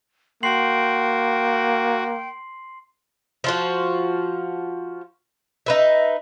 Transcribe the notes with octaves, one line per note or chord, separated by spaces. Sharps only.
A#3 F#4 G5 C6 C7 F#7
F3 F4 F#4
D#4 B4 E5